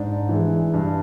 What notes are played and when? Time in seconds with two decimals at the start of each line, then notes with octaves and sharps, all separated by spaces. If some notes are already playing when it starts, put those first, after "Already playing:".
Already playing: G#2 D4
0.29 E3 G#3
0.74 G2